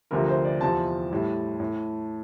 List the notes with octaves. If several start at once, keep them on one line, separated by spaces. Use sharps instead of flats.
D2 C3 F3 A#4
C5
D5
E2 C3 F3 A5
A2 G3
A2